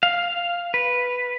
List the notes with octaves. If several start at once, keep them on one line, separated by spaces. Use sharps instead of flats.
F5
B4